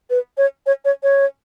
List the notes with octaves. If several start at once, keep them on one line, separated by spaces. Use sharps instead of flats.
B4
C#5
C#5
C#5
C#5